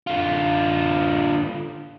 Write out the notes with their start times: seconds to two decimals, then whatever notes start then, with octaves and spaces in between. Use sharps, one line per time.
0.07 D3 F4